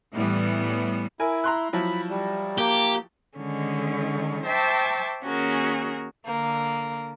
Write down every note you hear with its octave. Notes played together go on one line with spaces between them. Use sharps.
A2 E3 G3 B3
E4 A#4 G#5
A#5 C6 F#6
F3 F#3 E4 B5
G3
A#3 G4
D3 D#3 G#3 C#4
C5 E5 G5 A5 C#6 D6
D#2 C#4 F#4 G#4 A#4
D3 A#3